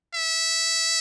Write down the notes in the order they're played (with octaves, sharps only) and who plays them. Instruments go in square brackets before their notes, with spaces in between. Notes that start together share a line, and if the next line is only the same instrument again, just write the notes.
[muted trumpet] E5